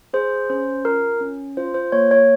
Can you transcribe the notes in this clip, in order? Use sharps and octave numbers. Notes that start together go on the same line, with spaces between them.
G#4 C5
C#4 C5
F4 A#4
C#4
F4 C5
C5
A#3 C#5
C#5